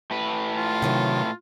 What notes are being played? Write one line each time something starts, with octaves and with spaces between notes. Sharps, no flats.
A2 B4
F4
C3 D#3 F#3